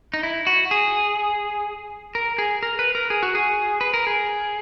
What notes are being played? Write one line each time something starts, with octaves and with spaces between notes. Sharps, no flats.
D#4
E4
F#4
G#4
A#4
G#4
A#4
B4
A#4
G#4
F#4
G#4
B4
A#4
G#4